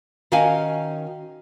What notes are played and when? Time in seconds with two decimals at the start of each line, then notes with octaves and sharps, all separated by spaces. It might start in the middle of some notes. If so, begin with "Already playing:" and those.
0.32 D#3 C#4 F#4 D#5 F5 G#5